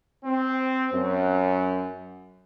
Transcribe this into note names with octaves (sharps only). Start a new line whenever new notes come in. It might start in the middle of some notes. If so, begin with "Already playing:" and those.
C4
F#2